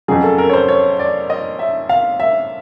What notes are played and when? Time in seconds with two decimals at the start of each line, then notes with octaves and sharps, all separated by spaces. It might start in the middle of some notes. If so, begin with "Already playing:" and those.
0.08 F2 C#3 F#3 G#4
0.24 A4
0.38 A#4
0.50 C#5
0.53 C5
0.68 C#5
0.99 D5
1.30 D#5
1.59 E5
1.89 F5
2.20 E5